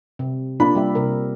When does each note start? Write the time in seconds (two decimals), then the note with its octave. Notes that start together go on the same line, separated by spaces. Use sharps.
0.19 C3
0.60 A#3 D4 F4 B5
0.75 G3 G4 E5
0.95 C3 A#4